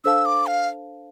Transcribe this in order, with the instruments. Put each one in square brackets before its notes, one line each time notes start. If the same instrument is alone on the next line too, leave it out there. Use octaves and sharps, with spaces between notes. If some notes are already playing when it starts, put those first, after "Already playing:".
[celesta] D4 A4 C5 F5 A5 [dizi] E6
[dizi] D6
F5